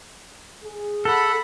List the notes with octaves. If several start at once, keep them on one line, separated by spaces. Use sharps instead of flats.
G#4
A4 F#5 B5